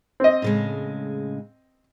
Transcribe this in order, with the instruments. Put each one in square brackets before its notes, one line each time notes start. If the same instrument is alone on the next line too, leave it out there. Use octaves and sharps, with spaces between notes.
[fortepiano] C4 D#5
[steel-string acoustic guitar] A2 C#3 G#3